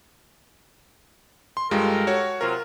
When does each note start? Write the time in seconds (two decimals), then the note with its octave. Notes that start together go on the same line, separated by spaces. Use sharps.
1.57 C6
1.71 G2 G#3 F4 G4 A4 A#4
2.07 F#4 C#5
2.41 C3 F#3 F4 A#4